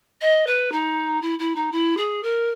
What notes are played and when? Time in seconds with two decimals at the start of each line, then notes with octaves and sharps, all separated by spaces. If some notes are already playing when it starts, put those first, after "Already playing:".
0.21 D#5
0.46 B4
0.72 D#4
1.22 E4
1.39 E4
1.55 D#4
1.72 E4
1.97 G#4
2.23 A#4